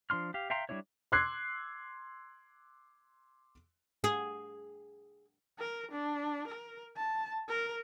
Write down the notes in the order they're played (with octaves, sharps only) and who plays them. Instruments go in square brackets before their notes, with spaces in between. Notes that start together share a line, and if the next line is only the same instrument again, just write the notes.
[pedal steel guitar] F3 D4 C6 F6
G4 F5
E5 F5 G5 A#5 C6
G3 C4 D4 E4 C#5
[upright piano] C6 D6 E6 F#6 G#6 C7
[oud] G#4
[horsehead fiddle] A#4
D4
A#4
A5
A#4